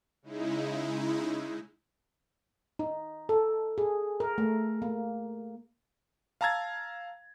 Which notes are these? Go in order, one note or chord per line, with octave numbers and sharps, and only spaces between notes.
C#3 G#3 D#4 E4
D#4
A4
G#4
A#4
A3
A#3
F5 A5 A#5 E6 G#6 A6